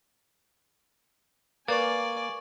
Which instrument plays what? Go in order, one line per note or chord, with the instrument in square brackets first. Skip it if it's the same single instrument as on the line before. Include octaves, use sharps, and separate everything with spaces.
[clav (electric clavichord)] A#3 [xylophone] B4 [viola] D5 G#5 [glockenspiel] C#6 A6